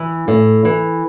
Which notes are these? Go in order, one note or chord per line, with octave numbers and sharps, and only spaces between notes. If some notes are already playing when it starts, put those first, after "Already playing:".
Already playing: E3
A2
E3